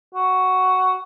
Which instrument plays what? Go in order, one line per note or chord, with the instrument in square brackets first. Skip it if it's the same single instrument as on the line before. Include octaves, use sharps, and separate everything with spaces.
[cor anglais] F#4